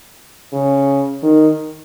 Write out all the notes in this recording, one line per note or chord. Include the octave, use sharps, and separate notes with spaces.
C#3
D#3